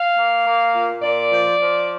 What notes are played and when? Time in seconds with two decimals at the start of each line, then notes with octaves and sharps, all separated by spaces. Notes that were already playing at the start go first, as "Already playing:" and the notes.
Already playing: F5
0.17 A#3
0.46 A#3
0.73 A#2
1.02 A#2 D5
1.30 F3
1.59 F3